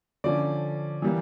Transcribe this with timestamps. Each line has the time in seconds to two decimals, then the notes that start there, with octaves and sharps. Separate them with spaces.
0.24 D3 F3 C#4 D5
1.02 E3 G3 A#3